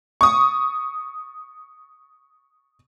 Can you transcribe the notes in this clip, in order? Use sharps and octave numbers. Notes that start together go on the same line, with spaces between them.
C#6 D#6